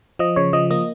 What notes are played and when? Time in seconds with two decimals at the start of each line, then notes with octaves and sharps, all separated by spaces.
0.19 F3 D#5
0.36 C#3 C#5
0.53 F3 D#5
0.71 A#3 D#5